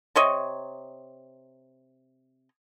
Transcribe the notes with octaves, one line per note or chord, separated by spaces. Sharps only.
C3 C#5 D#5